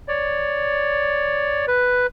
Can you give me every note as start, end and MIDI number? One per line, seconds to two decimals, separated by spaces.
0.08 1.66 73
0.08 1.66 74
1.68 2.07 71